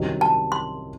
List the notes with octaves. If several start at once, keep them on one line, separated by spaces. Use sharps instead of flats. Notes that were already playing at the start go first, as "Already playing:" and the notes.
Already playing: C2 C3 D#3 F#3 C#4
A5
C6